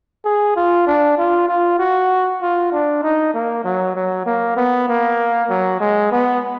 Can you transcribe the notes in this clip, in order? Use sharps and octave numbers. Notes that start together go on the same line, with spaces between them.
G#4
F4
D4
F4
F4
F#4
F4
D4
D#4
A#3
F#3
F#3
A#3
B3
A#3
F#3
G#3
B3